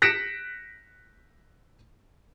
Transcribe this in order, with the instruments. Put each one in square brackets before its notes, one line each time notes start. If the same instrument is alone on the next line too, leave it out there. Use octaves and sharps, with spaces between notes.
[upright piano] F#6 A#6 B6 C#7 D7 E7